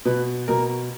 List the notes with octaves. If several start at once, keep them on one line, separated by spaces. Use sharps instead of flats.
B2 B4
B2 A#4